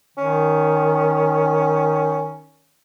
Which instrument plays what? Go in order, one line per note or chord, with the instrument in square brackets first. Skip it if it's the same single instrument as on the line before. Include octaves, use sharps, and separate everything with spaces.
[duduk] D#3 [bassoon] C#4